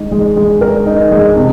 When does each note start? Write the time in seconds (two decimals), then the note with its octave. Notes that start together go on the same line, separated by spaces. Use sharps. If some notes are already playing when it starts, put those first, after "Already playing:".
Already playing: G#3 D#4
0.11 G#3
0.36 G#3
0.61 A#4
0.87 D#4
1.11 G#3
1.36 C3